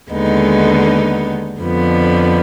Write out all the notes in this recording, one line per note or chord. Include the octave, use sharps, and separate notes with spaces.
D#2 D3 G#3 B3 D#4
F2 D3 F3 B3